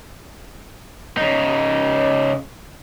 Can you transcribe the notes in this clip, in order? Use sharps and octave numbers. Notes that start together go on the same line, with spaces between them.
C#3 D#4